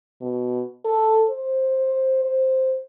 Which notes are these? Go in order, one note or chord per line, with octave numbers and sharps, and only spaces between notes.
B2
A4
C5
C5